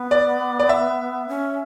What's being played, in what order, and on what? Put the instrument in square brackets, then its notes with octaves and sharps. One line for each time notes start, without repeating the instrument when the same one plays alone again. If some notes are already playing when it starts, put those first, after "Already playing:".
Already playing: [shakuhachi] B3
[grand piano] D5
D5
E5
[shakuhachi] C#4